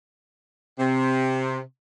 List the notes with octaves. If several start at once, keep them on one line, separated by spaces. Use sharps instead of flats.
C3